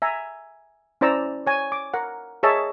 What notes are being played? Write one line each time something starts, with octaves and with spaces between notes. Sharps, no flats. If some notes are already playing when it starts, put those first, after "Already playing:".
E5 G#5 A#5
C#4 E4 C5 D5 A#5 E6
C#5 G#5
D6
A#4 F#5
G#4 A#4 C#5 D#5 E5 A5